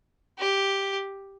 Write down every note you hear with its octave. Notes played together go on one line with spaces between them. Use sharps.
G4